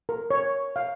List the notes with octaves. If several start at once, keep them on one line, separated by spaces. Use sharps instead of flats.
A#4
C#5
F5